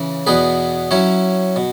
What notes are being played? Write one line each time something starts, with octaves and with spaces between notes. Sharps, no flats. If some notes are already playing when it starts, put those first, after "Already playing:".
Already playing: C#3 E3
E2 B2 B3 G#4 B4
F#3 C#4 E4 C#5
B2